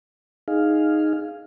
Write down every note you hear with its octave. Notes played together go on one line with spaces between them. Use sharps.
D#4 G#4 F5